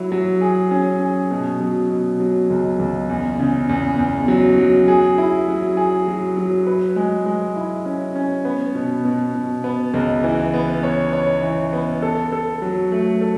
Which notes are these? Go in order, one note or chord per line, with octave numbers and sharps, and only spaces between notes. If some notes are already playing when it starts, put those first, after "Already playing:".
Already playing: F#3 E4
F#3
G#4
C#4
G#4
B2
F#3
B2
F#3
C#2
C#2
E2
C#3
E2
E2
F#3
F#3
G#4
E4
F#3
G#4
F#3
F#3
B4
G#3
G#3
E4
C#4
C#4
B3
B2
B2
B2
B3
C#2
E3
B3
C#5
C#5
E3
B3
A4
A4
F#3
A3
A4